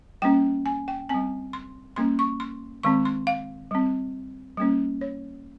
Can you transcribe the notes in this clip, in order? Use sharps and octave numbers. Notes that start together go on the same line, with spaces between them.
G3 A#3 C#4 G5
G#5
G5
G3 C4 G#5
C6
G3 A#3 C#4 C6
C#6
C6
D#3 G#3 C4 C#6
C6
F5
G3 C4
G3 A#3 C#4
C#5